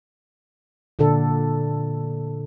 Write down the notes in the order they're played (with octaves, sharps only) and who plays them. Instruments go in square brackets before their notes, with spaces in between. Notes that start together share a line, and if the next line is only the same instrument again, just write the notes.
[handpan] A#2 D3 D4 A4